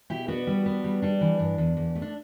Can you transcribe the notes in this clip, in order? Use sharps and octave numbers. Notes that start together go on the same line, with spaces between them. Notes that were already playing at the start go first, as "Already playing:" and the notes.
B2 E4 G4
B3 D4 F#4
G3
B3
G3
G3 D4
E3
G2
E2
E2
A3
D4